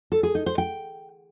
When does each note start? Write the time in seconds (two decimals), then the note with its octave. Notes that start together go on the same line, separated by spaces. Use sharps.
0.12 A4
0.23 G#4
0.35 D#4
0.46 C5
0.58 G5